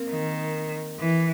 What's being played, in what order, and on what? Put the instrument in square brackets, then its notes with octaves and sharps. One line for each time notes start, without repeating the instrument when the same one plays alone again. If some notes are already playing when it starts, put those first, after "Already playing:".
Already playing: [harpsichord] A#3 C4
[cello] D#3
E3